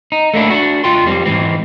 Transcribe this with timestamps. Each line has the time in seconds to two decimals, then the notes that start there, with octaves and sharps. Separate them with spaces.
0.12 D#4
0.34 A3 A#3 D4 E4
0.50 D4 F#4
0.84 C#2 F4 G5 C6
1.06 F2 G3 C4
1.26 G#2 E3 C4